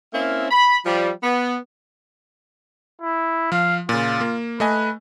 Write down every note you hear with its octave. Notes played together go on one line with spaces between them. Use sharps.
A#3 C4 C#4 E4 E5 F5
B5
F3 G3
B3
E4
F3 F5
A#2 C#3 F4
A#3
A3 B4 D#5 G#5